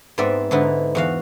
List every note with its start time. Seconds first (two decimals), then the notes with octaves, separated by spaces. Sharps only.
0.18 G#2 B3 C4 D5 E5
0.51 G#2 D3 B3 D#4 E4
0.95 E2 F#4 F5